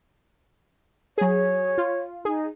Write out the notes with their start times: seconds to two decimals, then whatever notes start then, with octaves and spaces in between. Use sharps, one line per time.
1.18 F#3 G#4 C#5
1.78 F4
2.25 D#4 G#4